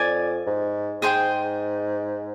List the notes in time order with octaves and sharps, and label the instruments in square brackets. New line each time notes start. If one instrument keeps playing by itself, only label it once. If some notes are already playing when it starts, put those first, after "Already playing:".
Already playing: [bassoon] F2 [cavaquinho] D5 G#5
[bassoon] G#2
[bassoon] G#2 [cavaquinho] G#4 C5 G5 C6